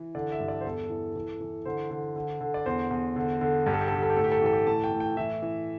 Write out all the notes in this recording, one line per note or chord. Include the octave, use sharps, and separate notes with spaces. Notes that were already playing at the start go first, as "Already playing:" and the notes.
Already playing: E3
D3 D5
E5
G2
D5
C5
E2 A4
E3
E3
E3
D3 C5
D3
D3
D3
D5
E2 C5
E2
D3
D3
G2 G4
A4
G4
A4
D3 G4
A4
G4
A2 A4
G4
A4
G4
E3 A4
G4
A2 A5
G5
A2
G5
E3 E5
E3